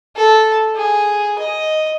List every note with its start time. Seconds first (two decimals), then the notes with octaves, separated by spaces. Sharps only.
0.16 A4
0.75 G#4
1.38 D#5